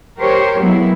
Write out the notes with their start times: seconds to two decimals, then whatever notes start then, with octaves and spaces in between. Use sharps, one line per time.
0.20 G4 A#4 C5 C#5
0.61 F#3 G#3 B3 E4